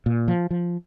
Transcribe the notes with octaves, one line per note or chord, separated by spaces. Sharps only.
A#2
F3
F3